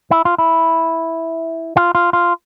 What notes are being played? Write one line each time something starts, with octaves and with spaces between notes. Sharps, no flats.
E4
F4
E4
F4
F4
F4